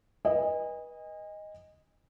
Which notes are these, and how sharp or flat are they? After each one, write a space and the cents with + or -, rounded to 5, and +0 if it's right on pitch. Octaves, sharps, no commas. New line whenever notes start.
B4 -25 D#5 +0 G#5 -35